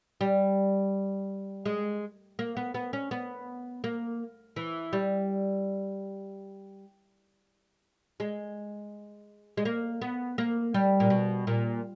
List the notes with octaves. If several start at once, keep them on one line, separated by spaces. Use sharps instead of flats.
G3
G#3
A#3
B3
B3
C#4
B3
A#3
E3
G3
G#3
G#3
A#3
B3
A#3
G3
A#2
B2
A#2